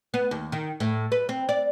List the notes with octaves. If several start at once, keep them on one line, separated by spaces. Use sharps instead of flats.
B3
D#2
D#3
A2
B4
C4
D5